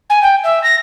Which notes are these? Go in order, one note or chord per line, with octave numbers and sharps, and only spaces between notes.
G#5
G5
E5
A#6